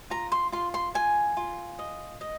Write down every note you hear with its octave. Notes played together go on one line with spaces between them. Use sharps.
F4 A#5
C6
F4 C6
C6
F4 G#5
F4
D#5
D#5